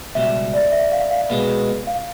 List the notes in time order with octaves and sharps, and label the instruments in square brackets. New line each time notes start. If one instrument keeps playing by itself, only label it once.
[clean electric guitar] C#2 B2 G3 [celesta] E5
[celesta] D5
E5
F5
F5
[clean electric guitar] B2 G#3 B3
[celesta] F5